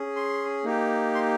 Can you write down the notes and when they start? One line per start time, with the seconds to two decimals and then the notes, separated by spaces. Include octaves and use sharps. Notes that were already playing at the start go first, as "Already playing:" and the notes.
Already playing: C#4 G#4
0.16 C6
0.64 A#3 D#4 G4
1.14 C6